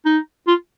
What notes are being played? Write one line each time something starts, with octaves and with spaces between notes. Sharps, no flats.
D#4
F4